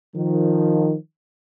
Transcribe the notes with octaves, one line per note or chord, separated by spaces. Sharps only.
D#3 F3